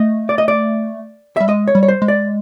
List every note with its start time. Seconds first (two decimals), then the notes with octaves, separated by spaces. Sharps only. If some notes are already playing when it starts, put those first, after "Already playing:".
Already playing: A3 D#5
0.29 D5
0.38 D#5
0.48 D5
1.37 G3 E5
1.48 G#3 D#5
1.68 C#5
1.75 G3
1.83 C#5
1.88 C5
2.02 G#3
2.08 D5